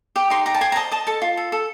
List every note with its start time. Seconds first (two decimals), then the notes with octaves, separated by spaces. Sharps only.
0.16 G4 G5
0.30 D#4 C6
0.46 G4 A#5
0.54 A5
0.61 C5 G#5
0.72 A#5
0.76 D#5 A5
0.91 D#5 A5
1.07 A4 A5
1.22 F4
1.37 A4
1.52 A4